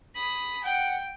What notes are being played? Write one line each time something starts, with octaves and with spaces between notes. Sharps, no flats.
B5 D#6
F#5 G5